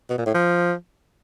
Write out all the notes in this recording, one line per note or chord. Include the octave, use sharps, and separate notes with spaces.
B2
A#2
A2
F3